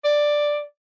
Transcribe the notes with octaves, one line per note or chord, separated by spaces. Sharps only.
D5